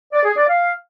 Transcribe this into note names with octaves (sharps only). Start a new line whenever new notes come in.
D5
G#4
D5
F5